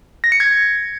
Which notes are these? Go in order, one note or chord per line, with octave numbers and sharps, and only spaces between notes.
A#6
C#7
G#6